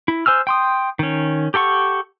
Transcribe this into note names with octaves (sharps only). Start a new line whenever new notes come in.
E4
C5 G#5 E6 F6
G5 C6 D#6
D#3 C#4
G4 A4 F#5 C#6